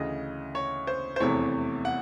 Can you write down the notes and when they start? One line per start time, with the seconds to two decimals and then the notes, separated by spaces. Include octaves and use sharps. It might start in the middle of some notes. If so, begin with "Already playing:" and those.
Already playing: D2 C#3 E3 D#5
0.55 C#5
0.87 C5
1.16 C5
1.20 F1 E2 C3 E3 A3 C#5
1.85 F#5